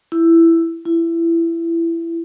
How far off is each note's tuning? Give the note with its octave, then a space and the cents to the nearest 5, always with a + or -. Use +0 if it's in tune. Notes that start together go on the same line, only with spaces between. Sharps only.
E4 +10
E4 +20